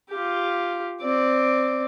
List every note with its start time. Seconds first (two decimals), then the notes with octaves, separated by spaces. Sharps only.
0.10 F4 G4
1.01 C4 D5